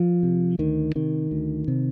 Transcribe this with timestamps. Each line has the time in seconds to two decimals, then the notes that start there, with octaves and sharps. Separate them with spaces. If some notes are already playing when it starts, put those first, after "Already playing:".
Already playing: F3
0.23 C3
0.59 D2 D#3
0.95 C3 D#3
1.31 D2
1.68 C3